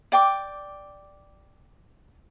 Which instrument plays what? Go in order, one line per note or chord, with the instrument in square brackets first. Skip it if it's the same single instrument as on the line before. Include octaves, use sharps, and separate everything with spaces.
[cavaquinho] D5 G5 D6